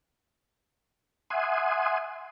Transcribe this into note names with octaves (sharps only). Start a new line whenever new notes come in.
E5 F#5 G#5 C6 D#6